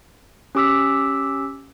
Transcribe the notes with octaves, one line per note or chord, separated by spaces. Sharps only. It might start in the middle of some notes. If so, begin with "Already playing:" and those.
C#4 G4 D6 E6 B6